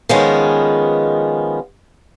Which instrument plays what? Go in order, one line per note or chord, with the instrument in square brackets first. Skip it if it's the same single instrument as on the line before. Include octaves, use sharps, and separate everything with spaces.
[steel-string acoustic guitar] D#3 F3 G#3 B3 C#4